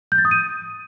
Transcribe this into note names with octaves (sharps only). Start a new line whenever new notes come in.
G6
A6
D#6
D#7